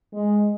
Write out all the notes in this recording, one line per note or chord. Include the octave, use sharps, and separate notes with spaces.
G#3